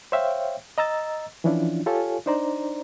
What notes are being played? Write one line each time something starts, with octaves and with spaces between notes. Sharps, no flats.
C5 C#5 E5 F5 G5
D#5 A#5 E6 A6
E3 F3 C#4 D4 E4 F4
F4 G4 A4 C#5 F5 G#5
D4 D#4 C5 D5 A#5